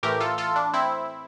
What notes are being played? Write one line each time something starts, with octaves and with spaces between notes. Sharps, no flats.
A2 E3 A3 G4 A#4
F4 A4
F4 A4
D4
C4 E4